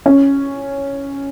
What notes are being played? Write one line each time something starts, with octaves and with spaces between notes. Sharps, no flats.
C#4